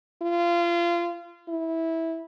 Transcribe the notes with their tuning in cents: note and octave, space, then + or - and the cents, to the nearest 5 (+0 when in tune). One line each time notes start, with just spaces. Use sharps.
F4 -25
E4 -15